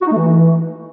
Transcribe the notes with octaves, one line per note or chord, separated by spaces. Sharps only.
F#4
D#4
A3
E3